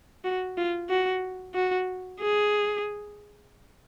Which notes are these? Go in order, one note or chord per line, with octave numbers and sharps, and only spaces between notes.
F#4
F4
F#4
F#4
G#4